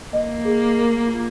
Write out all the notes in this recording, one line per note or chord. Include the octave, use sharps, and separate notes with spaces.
A#3 D#5
G#4
A#4
F4